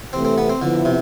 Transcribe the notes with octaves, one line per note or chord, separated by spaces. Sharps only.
C3 E3 A3 C4
C4
B3
C4
D3 F3 B3 E4
C3